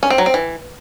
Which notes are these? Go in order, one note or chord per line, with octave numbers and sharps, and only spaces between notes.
C#4
C4
F#3
C4
E3